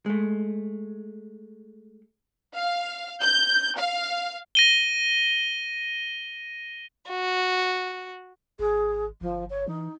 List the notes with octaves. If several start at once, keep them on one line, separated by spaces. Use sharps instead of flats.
G#3 A3
F5
G6
F5
A#6 D#7 G7
F#4
G#1 G#4
G1 F3
C#5
E3 D#4